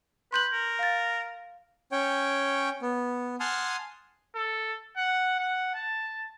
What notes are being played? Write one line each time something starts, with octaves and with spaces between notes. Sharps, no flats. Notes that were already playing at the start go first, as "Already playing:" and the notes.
B4 C6 G6 F#7
A#4
F5 A6
C#4 C#5 G5
B3
F#5 G#5 A5 C6 D#6 F6
A4
F#5
F#5
A5